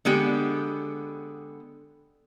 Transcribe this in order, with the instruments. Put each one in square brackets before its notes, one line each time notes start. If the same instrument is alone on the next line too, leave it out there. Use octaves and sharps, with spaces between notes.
[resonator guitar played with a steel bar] D3 G#3 B3 G4